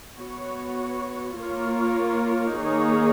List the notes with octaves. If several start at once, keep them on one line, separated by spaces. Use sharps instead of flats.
B3 F#4 C#5
A#3 F4 A#4 C#5
D#3 A#3 D#4 G#4 C#5